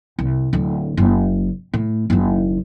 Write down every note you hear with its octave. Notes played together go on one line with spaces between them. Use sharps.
C2
D1 D3
F#1
A2
F#1 D#2